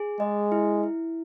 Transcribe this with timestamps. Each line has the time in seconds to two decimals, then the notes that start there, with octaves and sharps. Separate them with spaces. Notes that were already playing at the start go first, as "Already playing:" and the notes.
Already playing: G#4
0.20 G#3 D#5
0.52 E4
0.83 E4